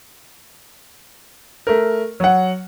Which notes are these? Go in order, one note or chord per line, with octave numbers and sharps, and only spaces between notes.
A3 A#4
F#3 F#5